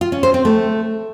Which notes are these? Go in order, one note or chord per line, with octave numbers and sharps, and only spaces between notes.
F4
C#4
C5
C4
A3